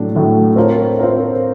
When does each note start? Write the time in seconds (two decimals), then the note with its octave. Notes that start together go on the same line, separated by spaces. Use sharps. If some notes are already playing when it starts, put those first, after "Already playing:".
Already playing: A2 F#3 A3 D4
0.15 A2 F#3 A3 D4
0.56 C4 F4 A#4 C#5
0.99 C4 F4 A#4 C#5